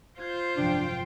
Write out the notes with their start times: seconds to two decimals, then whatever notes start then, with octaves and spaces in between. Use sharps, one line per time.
0.19 F4 C5 G6 G#6
0.57 G#1 F#2 C3 F3 D4 G5